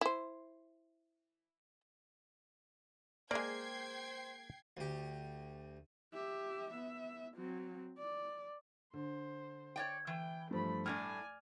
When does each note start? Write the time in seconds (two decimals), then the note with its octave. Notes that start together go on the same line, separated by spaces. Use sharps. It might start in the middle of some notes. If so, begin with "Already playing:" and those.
0.01 E4 C5
3.31 G#3 A#3 G#4 C5 D5 G5 G#6 C7
4.77 D2 G4
6.13 G4 E5
6.71 B3 E5
7.35 F#3 C4
7.98 D5
8.94 D3 C5
9.76 C#5 D5 G5
10.07 E3 G5
10.51 G2 F3 A3 B5
10.86 A2 G3 D4 D5 G#5 F6